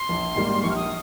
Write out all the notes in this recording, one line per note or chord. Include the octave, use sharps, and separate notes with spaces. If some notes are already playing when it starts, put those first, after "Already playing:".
Already playing: C6
A#1
G#2 D#3 G3 A#3
A#1 C#6
F6
D#6